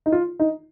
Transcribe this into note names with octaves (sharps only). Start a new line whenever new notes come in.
D#4
F4
D#4